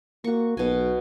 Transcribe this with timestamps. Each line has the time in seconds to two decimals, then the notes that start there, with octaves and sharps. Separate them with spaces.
0.24 A#3 F#4 C#6
0.57 B1 B2 G#5